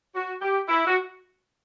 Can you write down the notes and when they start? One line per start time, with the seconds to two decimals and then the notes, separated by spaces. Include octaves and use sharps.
0.15 F#4
0.42 G4
0.69 E4
0.87 F#4